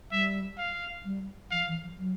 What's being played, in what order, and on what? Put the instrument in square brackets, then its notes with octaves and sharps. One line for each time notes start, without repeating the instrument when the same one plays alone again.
[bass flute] G3 [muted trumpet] E5
[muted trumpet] F5
[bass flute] G3
[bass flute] F3 [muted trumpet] F5
[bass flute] E3
F3
F#3